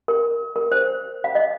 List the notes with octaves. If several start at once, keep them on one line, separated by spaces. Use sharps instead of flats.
A#4
A#4
C5
F5
D#5